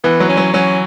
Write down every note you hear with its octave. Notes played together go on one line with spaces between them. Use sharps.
E3 B3
F#3
C#4
F#3
F#3 C#4